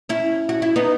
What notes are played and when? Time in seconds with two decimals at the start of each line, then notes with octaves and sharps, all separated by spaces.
0.09 C#4 E4
0.49 F#4
0.62 E4
0.76 B3 D#4